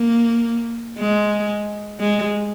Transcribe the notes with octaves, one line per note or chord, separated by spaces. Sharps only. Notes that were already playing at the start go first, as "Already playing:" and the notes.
Already playing: A#3
G#3
G#3